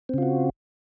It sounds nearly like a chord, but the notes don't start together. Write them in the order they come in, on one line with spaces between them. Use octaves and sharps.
C4 C#3 F4 F#4